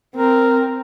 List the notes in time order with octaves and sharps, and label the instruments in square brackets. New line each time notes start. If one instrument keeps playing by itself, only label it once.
[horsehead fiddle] C4 [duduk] A#4